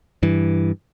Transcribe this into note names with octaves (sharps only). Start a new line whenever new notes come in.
G2 E3